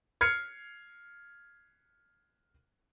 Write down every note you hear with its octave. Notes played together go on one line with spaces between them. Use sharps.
F6 G#6 C7 C#7